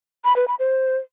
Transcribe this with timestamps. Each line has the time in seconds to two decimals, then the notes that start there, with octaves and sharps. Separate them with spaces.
0.25 B5
0.36 B4
0.48 B5
0.59 C5